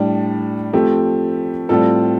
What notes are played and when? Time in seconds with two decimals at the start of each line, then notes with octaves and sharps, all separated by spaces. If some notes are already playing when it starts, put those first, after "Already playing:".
Already playing: A2 G3 D4
0.73 F3 A3 C4 G4
1.69 A2 G3 C4 F4 A4